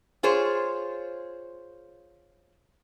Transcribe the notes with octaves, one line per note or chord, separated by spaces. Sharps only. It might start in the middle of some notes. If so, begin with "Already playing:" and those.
F4 G#4 C5 C#5